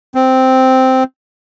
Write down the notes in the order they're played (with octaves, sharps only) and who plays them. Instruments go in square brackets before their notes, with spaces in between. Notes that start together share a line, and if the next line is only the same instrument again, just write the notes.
[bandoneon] C4